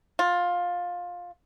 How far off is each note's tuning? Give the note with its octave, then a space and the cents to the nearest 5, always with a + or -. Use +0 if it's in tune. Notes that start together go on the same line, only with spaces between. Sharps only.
F4 +15